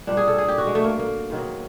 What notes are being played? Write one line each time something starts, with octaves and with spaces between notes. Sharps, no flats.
A#2 G3 D4
G#4
A4
G#4
G4
F#4
G#3
A3
A#3
A#3
G#2 D#3 F#3